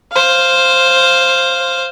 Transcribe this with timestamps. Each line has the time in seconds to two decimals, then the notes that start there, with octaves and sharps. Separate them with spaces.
0.13 C5 F5